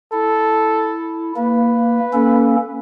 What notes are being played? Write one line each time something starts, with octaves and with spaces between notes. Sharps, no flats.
E4 A4
A#3 B4
A#3 C#4 A4